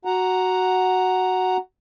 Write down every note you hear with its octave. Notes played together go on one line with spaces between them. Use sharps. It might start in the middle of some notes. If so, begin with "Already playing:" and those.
F#4 F#5 A#5